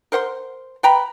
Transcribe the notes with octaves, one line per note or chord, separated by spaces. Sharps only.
A#4 C5 F#5 C6
B4 G5 A#5 B5